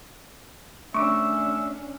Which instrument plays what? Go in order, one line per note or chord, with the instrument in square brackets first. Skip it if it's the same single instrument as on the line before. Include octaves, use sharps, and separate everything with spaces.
[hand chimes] A3 [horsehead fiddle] C#4 D4 [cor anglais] E5 [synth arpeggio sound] C#6 D6